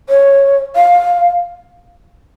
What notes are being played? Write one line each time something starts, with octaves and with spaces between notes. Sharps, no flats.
C#5
F5